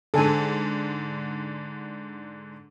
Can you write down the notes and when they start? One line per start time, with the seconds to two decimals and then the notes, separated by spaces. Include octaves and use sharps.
0.14 G#2 D3 A4 G#5